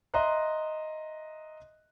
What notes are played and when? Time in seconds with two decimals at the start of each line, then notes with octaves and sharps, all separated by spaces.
0.14 D#5 E5 A#5 C6 F#6